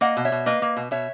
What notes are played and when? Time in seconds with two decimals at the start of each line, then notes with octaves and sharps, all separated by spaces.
0.01 A#3 D#5 F#5
0.17 B2
0.25 C#5 E5
0.32 B2
0.46 A#3 B4 D#5
0.62 A#3
0.77 B2
0.91 B2 C#5 E5